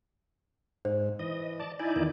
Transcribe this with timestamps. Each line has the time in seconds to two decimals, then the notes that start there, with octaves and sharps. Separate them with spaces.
0.85 G#2 C5
1.19 E3 D#5
1.60 D5 A5
1.79 D#4 E4 D5 G#5
1.96 E2 D#3